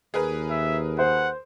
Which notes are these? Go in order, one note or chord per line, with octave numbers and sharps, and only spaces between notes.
D#2 G#4 A#4 B4
E5
C5 F#5